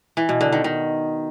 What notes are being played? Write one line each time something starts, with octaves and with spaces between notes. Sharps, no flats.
E3
B2
D3
D#3
D#3